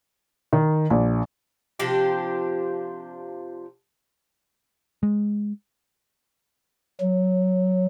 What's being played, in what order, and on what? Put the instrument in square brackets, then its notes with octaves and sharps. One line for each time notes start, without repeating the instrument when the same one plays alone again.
[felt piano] D#3
A#1
[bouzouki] C3 F3 D4 G4
[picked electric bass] G#3
[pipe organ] F#3